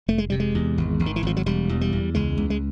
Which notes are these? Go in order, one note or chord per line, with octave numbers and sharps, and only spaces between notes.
F1 A3
G#3
C3 G3
G#3
E2
G#1
G#1
D#3
E3
G#1 F3
F#3
E1 G3
E2
G3
E2
C#2 G#3
C#2
G#3